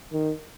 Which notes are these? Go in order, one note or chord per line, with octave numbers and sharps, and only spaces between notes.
D#3